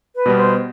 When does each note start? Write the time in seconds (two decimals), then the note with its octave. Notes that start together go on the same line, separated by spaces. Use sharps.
0.16 B4
0.26 B2 G3 B3
0.37 C5